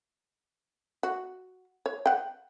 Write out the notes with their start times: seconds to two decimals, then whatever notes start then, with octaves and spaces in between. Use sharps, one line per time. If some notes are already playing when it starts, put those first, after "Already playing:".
1.03 F#4
1.86 C#5
2.06 F#5 G5